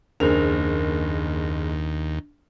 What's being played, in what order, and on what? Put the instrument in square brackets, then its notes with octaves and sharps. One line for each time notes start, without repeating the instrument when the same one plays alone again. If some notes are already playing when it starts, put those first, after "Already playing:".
[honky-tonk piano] F#1 F7 [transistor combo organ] D#2 [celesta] D4 [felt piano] G#4 A#4 C5